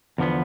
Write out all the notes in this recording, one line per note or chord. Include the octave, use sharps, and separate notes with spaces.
E2 D3 F3 B3